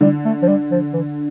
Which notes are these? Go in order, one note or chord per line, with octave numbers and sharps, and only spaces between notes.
D3 G3
A3
F3
G3
F3
E3